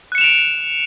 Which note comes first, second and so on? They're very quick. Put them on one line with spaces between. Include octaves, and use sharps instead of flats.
F#6 C#7 E7 F7 D7